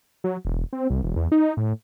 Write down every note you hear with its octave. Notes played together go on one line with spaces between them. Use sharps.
F#3
E1
C4
C2
E1
E2
D#4
A2